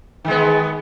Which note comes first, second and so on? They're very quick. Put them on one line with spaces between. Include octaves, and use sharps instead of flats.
D#3 G#3 B3